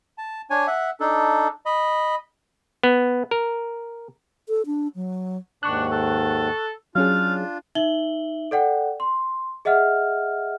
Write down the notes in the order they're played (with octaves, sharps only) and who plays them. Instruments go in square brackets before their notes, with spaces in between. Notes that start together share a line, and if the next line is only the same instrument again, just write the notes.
[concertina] A5
D4 C#5 G#5
E5 F#5
D4 D#4 A4
D#5 B5
[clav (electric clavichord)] B3
A#4
[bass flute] A4
D4
F#3
[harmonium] D#2 G#2 D#3 [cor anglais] D4 [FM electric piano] C#6 F#6
[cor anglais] A4
[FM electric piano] F#3 C#4 G#4 [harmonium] D4 F4 [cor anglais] F5
[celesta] D#4 E5 F#7 G7
A4 D5 F#5 G5
C6
G#4 D#5 E5 F#5 F6